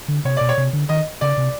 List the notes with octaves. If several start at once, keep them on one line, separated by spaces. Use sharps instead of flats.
D3
C3 C#5
B2 D5
C#5
C3
D3
D#3 D#5
C#3 D5
C3